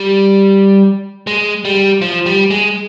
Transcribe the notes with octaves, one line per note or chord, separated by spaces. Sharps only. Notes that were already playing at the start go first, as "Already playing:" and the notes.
Already playing: G3
G#3
G3
F3
G3
G#3